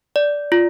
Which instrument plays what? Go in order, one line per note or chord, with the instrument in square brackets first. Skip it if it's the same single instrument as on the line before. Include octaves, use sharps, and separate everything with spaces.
[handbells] D5
F4